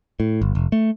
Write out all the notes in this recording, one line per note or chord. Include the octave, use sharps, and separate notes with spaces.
A2
G1
F1
A3